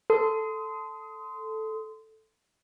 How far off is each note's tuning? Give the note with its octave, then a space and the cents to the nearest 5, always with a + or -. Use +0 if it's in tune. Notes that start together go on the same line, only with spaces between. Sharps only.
A4 +0 C6 -20 D#6 +20